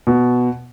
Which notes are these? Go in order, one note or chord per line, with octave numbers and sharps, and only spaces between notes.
B2